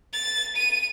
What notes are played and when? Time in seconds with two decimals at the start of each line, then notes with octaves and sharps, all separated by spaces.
0.13 A6
0.55 D#7